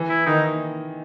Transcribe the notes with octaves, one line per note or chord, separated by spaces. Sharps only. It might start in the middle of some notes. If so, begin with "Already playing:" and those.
Already playing: E3
E4
D#3 D#4